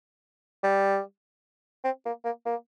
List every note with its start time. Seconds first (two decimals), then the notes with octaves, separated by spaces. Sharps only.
0.63 G3
1.84 C4
2.06 A#3
2.25 A#3
2.46 A#3